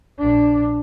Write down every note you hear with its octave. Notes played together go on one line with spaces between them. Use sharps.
A#1 D4